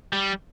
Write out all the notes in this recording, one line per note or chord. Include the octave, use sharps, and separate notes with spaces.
G3